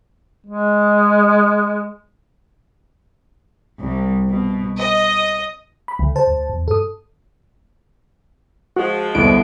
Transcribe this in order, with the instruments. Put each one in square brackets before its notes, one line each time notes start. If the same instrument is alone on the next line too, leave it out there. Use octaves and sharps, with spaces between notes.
[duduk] G#3
[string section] C2
B2
D#5
[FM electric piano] B5
[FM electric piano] C#2 [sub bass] D3
[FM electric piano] C5 A5
[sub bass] D2
E2
[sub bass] G2 [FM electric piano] A4 D#6
[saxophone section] F3 G#3 [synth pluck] F#4
[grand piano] C2 [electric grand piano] D3 B3 [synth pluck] D7